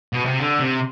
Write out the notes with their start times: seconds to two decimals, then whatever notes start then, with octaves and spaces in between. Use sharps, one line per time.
0.13 B2
0.25 C3
0.39 D3
0.59 C3